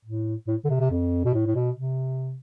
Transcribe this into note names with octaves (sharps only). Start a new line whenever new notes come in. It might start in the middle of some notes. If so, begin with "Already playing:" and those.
A2
A2
D3
C3
C3
F2
B2
A2
A2
B2
C3